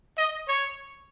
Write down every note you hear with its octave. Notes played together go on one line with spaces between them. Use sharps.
D#5
C#5